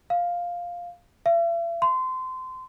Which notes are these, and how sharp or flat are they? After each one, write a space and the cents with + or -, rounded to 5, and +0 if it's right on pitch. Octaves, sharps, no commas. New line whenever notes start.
F5 +5
E5 +45
C6 -25